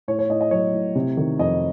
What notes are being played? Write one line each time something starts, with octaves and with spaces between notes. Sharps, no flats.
A2 C#5
C#5
A2 D#5
D#5
F#3 C#5
A2
C3
D#3
F2 D#5